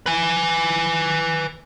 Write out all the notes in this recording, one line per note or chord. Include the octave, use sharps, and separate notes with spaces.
B4 G#5